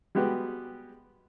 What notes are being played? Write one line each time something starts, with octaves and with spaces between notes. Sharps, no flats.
G3 G#3 B3 F#4 G4